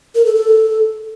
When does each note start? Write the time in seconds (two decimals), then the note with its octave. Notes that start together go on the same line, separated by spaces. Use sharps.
0.15 A#4
0.25 A4
0.36 A4